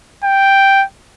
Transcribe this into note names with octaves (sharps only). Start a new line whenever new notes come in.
G5